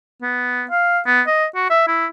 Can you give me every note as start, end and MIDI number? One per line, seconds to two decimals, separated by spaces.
0.22 0.64 59
0.70 0.99 77
1.06 1.21 59
1.27 1.45 75
1.55 1.66 66
1.70 1.84 76
1.87 2.06 64